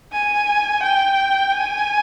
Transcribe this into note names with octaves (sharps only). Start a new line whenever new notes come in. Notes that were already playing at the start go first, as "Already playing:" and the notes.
G#5
G5
G#5